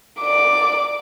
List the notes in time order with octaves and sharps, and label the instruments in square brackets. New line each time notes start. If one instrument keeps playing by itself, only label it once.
[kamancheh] D5 D6